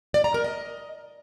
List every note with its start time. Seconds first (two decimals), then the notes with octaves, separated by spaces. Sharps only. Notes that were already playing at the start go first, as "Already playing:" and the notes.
0.14 D5
0.24 A#5
0.34 A#4
0.44 D#5